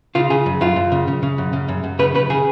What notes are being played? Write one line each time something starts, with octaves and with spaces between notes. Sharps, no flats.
C#3 F4
C#3 G#4
F#2
F#2 F4
F#2
C#3
C#3
C#3
F#2
C#3
F#2
F#2
C#3 B4
C#3 B4
C#3 G#4